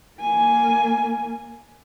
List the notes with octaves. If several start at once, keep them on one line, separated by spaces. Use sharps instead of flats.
A#3 G#5